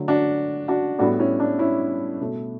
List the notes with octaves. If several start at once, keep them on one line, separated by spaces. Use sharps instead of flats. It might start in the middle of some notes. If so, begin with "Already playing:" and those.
Already playing: D3 F#3 A3
D4 F#4
D4 F#4
A2 G3 B3 D4 F#4
C#4 E4
D4
C#4 E4
B2 A3